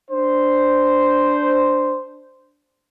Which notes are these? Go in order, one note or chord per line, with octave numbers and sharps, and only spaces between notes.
D4 C5